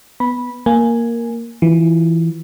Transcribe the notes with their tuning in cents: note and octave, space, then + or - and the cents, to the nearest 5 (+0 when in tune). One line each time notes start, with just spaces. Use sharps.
B3 +0 B5 -10
A#3 +0 G#5 +0
E3 +0 F4 +0